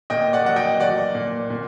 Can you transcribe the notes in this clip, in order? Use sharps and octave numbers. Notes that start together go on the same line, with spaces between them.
A#2 D#5 G5
D5 F#5
F#3 F#5
D#5 G5
F#3 D5 F#5
A#2
A#2